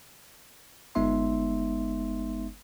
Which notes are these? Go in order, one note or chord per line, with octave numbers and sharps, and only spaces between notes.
G1 G#3 B3 D#4 E5 C6